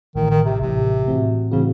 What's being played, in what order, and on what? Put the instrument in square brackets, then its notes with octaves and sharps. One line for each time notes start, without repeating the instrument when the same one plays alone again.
[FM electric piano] A1 A2 E3 [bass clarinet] D#3
[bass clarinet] D#3
C3
[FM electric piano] A1 A2 E3 [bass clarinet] C3
[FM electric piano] A2 E3 C4 F#4
[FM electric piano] A2 E3 C4 F#4 [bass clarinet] C#3